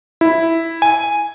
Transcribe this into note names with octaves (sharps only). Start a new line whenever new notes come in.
E4
G#5